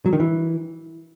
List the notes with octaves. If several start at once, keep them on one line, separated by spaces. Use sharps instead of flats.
F#3
D#3
E3